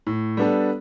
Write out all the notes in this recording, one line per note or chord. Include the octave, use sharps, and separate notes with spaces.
A2
G3 B3 D4 A4